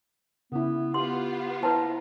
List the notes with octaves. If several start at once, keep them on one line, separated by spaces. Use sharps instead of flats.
C#3 B3 E4
B3 F4 G4 C6
E4 B4 C5 A5 A#5